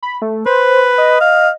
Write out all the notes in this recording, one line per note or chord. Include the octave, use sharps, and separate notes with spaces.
B5
A3
B4 C5
D#5
F5